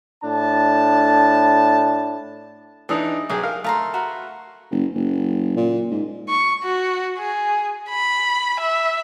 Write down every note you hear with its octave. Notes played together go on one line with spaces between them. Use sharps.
A2 D4 A5
E3 D4 D#4 G#4
B1 G4 G#4
A#4 F5
A3 F5 A#5 C6
F#4 A#4 B4
F#1
F#1
A#2
G#2
C#6
F#4
G#4
B5
E5